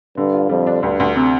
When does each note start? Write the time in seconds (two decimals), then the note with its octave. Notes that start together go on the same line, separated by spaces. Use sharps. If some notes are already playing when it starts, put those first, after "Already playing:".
0.17 G2 D3
0.34 F4
0.49 F2 G3
0.67 D4
0.83 D2 G2
1.00 D2
1.16 C3